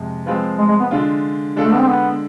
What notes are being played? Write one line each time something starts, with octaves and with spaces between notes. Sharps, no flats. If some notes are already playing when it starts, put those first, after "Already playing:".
Already playing: F2 C3 G#3
F3 G#3 C4 F4 B4
G#3
G#3
B3
D3 G#3 D4 F4
D3 G#3 D4 F4 A4
A3
B3
C4
B3